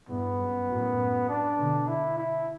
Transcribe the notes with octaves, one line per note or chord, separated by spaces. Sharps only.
E2 G2 B3
F#2
F#2 A2
D4
B2 D3
E4
E4